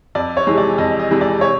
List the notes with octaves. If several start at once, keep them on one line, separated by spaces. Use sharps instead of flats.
F2 D5
C#5
C3 E3 G#3
D5
F2 D#5
D#5
C3 E3 G#3
D5
C3 C#5